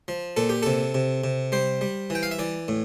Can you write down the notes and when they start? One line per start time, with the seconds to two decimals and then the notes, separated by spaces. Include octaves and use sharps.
0.08 F3
0.37 A#2 A4
0.49 G4
0.63 C3 A4
0.94 C3
1.24 C3
1.52 G3 C5
1.81 G3
2.10 E3
2.15 G5
2.23 F5
2.31 E5
2.39 E3 D5
2.68 A2